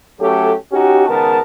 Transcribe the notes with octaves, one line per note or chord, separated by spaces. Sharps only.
F#3 A3 C#4 G4 A4
C#4 D#4 F#4 G4
C#2 D#3 B3 A#4 A5